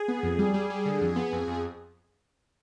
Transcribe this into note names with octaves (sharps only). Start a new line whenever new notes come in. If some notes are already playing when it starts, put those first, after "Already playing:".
Already playing: G#4
B3
F2
G3
G3
G3
D3
F2
B3
F2
F2